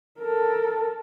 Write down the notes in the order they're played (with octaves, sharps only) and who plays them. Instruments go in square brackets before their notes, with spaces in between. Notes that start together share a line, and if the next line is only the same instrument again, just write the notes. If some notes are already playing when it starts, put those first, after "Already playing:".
[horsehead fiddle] A4 A#4